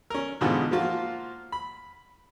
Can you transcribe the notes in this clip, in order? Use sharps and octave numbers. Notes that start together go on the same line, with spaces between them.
C#4 A#4
E2 G#2 B2 D3 B3 F4
F3 A#3 F4 F#4
B5